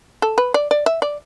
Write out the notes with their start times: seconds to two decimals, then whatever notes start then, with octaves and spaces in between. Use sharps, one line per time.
0.22 A4
0.38 B4
0.54 D5
0.71 D5
0.86 E5
1.02 D5